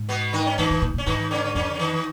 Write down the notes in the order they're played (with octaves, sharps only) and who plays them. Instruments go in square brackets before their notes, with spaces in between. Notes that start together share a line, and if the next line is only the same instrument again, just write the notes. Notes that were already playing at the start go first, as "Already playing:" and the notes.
Already playing: [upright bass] G#2
[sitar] B2 B3
D#3 D#4
C#4
[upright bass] F#2 [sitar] D#3 D#4
[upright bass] G#2
A#2
[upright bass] A#2 [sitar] C#4
[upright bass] G#2 [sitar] D#3 D#4
[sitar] C#3 C#4
[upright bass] F2 [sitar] C#3 C#4
[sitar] C#4
D#3 D#4